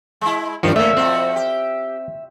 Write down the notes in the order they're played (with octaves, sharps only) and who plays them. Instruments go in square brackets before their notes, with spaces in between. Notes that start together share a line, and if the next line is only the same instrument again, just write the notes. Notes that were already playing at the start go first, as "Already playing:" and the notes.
[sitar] G#3 E4
[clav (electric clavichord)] G2 D#3 F3 [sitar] F#4 C#5 D5 [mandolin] C#6
[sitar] F3 C#4 [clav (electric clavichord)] A3 A#3 [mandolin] E5
[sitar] F2 F4 F#4 [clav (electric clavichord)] C4
[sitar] G4